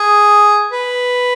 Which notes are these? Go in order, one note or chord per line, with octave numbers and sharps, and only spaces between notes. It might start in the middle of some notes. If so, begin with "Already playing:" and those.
Already playing: G#4
B4